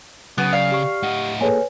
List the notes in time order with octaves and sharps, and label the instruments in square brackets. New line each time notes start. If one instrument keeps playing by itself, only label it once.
[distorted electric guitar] C#3 [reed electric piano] F#3 [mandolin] B3
[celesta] D5 [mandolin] F5
[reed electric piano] G4 C#6
[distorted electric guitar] A2 D#5 [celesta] F#5
[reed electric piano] A#3 G#4 A4 [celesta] B4 C#5 G#5